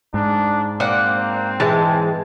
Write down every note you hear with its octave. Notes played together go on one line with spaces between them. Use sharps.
G#2 D4
A#3 C4 D5 F#5
E3 G#3 A5